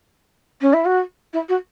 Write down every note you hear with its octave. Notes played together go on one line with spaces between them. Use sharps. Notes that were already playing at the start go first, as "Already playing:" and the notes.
C#4
E4
F#4
E4
F#4